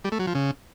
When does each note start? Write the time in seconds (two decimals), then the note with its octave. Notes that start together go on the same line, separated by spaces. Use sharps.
0.04 G3
0.12 A3
0.20 F#3
0.27 F3
0.35 C#3